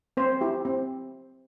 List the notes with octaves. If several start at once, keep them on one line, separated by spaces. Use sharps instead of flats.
C4 C5
E4 G4
C4